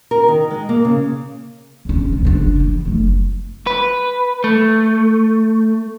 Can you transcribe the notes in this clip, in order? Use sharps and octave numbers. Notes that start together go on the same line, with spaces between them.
A#4
D#3
G#3
A#3
C#3
E2 C#4
C#2 C3
F#1 D4
E3
F#1 A3
B4
A3